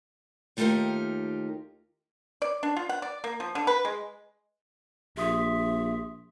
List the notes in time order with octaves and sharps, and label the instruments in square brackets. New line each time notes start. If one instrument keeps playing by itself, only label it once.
[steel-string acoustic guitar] D#2 A3 D#4 F4 G4 A#4
[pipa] D5
D4
F4
F#5
D5
A#3
F3
D3
B4
G#3
[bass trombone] A#1 [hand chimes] G4 C6 D#6 [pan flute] E5